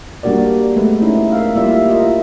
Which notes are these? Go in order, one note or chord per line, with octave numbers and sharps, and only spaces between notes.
G3 A#3 D4 F#4 A#4 D5
G#3 A3 B3 B4
C#4 D#4 E4
A#4 E5 F5
G3 A#3 E4 F4 D5 E5
E4 F4 A#4 D#5